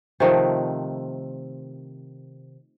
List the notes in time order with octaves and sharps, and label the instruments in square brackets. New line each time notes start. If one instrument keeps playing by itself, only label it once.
[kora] C3 D#3 F3 A3